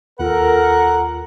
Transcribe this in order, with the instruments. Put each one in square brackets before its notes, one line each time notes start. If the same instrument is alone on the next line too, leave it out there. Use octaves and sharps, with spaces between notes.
[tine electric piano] D#2 F4 [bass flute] A4 [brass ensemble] A#4 [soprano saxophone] F#5